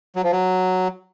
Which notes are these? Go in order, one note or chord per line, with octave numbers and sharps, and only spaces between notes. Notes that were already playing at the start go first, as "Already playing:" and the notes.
F#3
F3
F#3